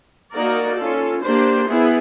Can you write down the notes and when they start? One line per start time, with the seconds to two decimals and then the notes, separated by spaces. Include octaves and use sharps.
0.33 A#3 D#4 F#4 A#4 D5
0.78 C#4 F4 A4
1.23 A#3 D4 G4 C5
1.68 B3 E4 G#4